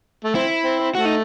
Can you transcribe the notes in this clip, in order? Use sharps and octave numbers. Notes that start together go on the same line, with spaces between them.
A3
C4 E4
C4
C4
A3 F#4
D#4